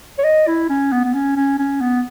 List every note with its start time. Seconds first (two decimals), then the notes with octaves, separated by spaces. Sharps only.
0.19 C#5
0.24 D#5
0.47 E4
0.69 C#4
0.92 B3
1.04 B3
1.14 C#4
1.36 C#4
1.59 C#4
1.81 B3